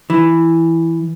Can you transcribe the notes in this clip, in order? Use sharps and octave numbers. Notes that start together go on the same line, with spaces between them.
E3